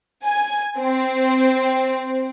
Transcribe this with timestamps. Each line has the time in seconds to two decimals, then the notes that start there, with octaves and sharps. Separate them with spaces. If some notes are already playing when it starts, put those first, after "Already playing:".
0.24 G#5
0.78 C4